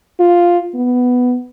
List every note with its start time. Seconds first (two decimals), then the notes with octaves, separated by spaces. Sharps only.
0.20 F4
0.75 B3